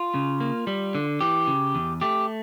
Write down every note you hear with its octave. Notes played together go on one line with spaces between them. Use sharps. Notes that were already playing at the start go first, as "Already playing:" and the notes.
Already playing: F4
C#3
A#3
G3
D3
E3 G4
C#3
E2
A3 G4